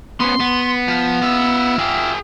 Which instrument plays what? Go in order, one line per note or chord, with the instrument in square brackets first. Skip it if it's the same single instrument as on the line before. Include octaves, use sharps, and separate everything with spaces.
[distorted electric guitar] B3 C#4 [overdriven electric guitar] C6
[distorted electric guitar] B3
[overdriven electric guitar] F3
F4 E5
[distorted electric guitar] G#4 G5